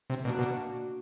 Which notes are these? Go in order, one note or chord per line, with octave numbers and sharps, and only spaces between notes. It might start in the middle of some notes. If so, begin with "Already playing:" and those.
C3
B2 A#3 D4 F#4
B2